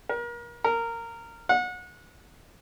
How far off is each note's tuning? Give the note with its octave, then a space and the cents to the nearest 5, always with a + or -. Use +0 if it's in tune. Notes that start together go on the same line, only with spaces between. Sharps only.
A#4 +35
A#4 -15
F#5 -30